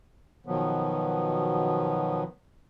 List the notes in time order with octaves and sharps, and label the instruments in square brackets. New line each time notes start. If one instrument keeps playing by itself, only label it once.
[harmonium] B2 D#3 F3 F#3 B3